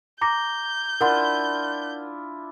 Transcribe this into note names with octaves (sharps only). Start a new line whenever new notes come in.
A#5 D6 G6 A#6
D4 E4 F4 A#4 F#5 C6